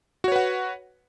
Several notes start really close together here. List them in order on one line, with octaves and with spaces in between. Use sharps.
F#4 C#5 B4 F#5